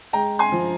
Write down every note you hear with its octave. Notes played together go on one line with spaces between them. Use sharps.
G#3 G5 A#5
G#5 C6
F3